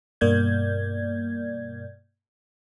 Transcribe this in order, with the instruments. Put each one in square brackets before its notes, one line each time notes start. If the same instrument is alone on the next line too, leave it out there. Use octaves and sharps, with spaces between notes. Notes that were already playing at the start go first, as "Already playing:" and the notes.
[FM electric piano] G2 B2 A#3 D5 G6 G#6